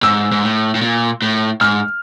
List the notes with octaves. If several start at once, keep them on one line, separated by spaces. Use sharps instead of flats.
G#2 E6
G#2
A2
A2
A#2
A2
G#2 F6